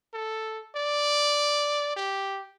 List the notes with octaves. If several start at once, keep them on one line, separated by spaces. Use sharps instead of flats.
A4
D5
G4